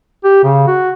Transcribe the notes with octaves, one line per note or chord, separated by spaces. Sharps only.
G4
C#3
F#4